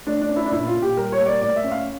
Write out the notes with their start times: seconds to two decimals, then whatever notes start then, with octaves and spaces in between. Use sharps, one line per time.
0.07 A3 D4
0.21 D4
0.29 C#4
0.36 E4
0.46 D4
0.51 A#2 E4
0.67 F4
0.75 A#2
0.82 G4
0.97 G3 A#4
1.12 C#5
1.20 A#3
1.26 D5
1.41 A2 D5
1.56 E5
1.64 C#4
1.72 F5